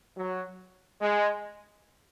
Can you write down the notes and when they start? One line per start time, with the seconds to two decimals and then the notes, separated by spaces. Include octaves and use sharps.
0.17 F#3
1.02 G#3